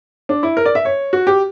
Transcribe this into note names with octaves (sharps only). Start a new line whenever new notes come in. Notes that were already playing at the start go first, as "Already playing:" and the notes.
D4
E4
A#4
D5
E5
C#5
F#4
G4